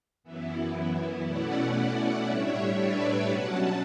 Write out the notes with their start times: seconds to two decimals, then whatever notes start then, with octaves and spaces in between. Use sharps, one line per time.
0.24 F#2 E3 B3 E4
1.25 B2 A3 C#4 E4 D5 F#5
1.76 D5 F#5
2.26 A2 G3 D4 C#5 E5
2.77 B4 D5
3.28 B2 F#3 C#4 F#5 A5